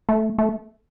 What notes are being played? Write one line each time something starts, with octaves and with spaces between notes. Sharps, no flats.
A3
A3